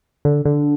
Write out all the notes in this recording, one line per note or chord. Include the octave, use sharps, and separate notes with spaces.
D3
D3